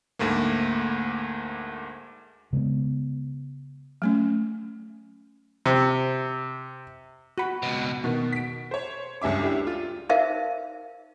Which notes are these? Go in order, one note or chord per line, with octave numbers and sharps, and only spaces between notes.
D2 G#2 A3 A#3
C#3 G#3 A#3 B3
F#3 A3 C#4
C3
F#4 B5
C#2 B2
B2 D#3
B6 D7
C5 C#5
C#2 G2 C#4 E5 D6
D4 E4 G4 E5
F4
D#4 A#4 C5 E5 F5